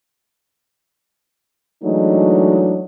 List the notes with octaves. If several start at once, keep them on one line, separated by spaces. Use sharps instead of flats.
E3 F#3 G#3 A3 D4 D#4